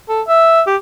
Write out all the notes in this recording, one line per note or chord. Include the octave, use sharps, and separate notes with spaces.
A4
E5
G4